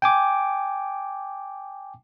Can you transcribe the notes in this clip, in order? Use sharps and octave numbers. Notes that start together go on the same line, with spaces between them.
G5 G#5 D6